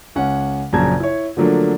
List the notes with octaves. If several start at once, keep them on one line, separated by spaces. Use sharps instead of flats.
C#2 C#4 F#5
A#1 F#2 C#3 A5 A#5 G#6
E4 C#5
D3 F3 F#3 A3 A#3 D4